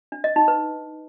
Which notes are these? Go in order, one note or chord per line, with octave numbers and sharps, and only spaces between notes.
D4
D#5
D#4
B4